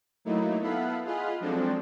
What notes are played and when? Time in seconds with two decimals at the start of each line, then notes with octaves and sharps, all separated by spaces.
0.25 F#3 A3 A#3 D#4 E4
0.61 B3 E4 A4 F5 F#5 B5
1.05 F4 G#4 D#5 F#5 B5 F6
1.40 F3 F#3 G#3 C4 D4 A4